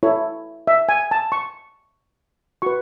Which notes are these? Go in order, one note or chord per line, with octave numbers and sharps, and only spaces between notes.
E4 A4 C#5
E5
G#5
A5
C#6
F#4 B4 C#6